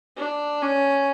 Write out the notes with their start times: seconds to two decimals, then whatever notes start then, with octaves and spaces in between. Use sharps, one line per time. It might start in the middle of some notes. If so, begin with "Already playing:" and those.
0.17 D4
0.62 C#4